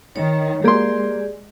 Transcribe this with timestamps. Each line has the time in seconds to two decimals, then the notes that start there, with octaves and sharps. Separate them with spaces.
0.16 D#3 C#5
0.64 G#3 A#3 G4 G#4 D5 C6